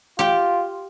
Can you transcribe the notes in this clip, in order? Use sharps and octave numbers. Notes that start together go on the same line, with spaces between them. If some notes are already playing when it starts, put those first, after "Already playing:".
F4 G4 G5